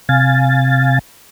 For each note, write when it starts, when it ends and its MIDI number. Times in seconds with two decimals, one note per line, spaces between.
0.09 0.99 48
0.09 0.99 77
0.09 0.99 80
0.09 0.99 93